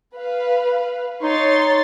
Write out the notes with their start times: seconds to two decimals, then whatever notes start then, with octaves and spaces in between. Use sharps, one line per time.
0.13 B4 F5
1.22 D#4 C#5 C6 A6